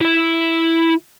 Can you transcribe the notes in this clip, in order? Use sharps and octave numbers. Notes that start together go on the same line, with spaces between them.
E4 E5